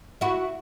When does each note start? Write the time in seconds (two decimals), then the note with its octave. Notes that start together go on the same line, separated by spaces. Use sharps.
0.21 E4 F#4